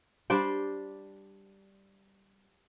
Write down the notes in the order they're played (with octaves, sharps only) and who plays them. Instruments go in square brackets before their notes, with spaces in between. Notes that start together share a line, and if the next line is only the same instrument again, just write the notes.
[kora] G3 D4 C5 G5